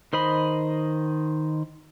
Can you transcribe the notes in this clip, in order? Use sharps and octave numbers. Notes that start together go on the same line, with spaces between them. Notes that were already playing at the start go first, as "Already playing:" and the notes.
D#3 C5 D#5 B5